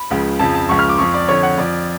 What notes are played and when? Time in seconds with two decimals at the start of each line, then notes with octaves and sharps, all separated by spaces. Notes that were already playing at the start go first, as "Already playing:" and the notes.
Already playing: B5
0.10 C#2 C#3 F3
0.39 F2 C#3 F3 A5
0.55 A5
0.69 C#2 C#3 F3 C#6
0.79 F6
0.89 D6
0.98 F2 F3 C#6
1.14 D5
1.28 F2 D3 F3 C#5
1.43 F#5
1.58 F2 F3 D5